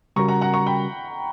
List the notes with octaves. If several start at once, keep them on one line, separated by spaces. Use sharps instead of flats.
C#3 G3 C#4 F#4 A#4 A#5 C#6
F#5 A#5
F#5 A#5
A#5 C#6
G5 B5